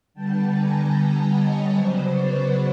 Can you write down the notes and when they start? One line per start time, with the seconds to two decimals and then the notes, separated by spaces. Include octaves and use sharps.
0.14 D3 G3 B3 G5 A5
0.54 G#5 A#5
0.95 G5 A5
1.34 C#5 D#5
1.74 C#3 F#3 B3 C5 D5
2.15 B4 C#5